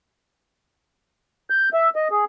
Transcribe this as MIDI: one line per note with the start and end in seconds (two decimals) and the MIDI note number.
1.50 1.69 91
1.73 1.90 76
1.96 2.08 75
2.11 2.25 68